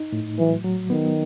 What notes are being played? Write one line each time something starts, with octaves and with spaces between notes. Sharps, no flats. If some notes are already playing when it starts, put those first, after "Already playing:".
Already playing: D#4
A2
E3 F#3
F#3
D#3 B3